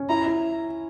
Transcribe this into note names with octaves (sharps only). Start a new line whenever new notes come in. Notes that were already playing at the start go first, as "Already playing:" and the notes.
Already playing: C#4
E4 A#5
E4